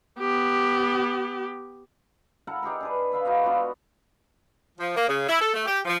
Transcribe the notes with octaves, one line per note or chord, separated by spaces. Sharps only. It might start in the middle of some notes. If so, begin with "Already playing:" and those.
B3 G4
E4 A4 A#4 F#5
D#4 G4 G#4 A#4
D4 G#4 B4
B4 E5 F5 B5
D#4 F#4 E5 F5
B3 D4 F4 F#4
F3
A#3
C#3
E4
A4
A3
G4
F3